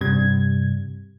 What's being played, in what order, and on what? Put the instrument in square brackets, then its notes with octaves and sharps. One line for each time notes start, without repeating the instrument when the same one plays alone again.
[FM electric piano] G2 C3 G3 G#6